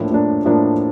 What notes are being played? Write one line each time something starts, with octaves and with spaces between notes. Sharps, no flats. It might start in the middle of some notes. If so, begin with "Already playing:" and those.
Already playing: A2 F3 A#3 D4
A2 F3 A#3 D4
A2 F3 A#3 D4